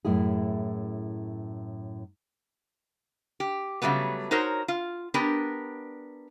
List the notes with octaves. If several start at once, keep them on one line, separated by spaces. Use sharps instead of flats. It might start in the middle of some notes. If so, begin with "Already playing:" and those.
F#2 A2 E4 G#4
G4
C#3 F#3 G3 A3 B3
D#4 F#4 A#4 C5 C#5
F4
B3 D4 G4 A#4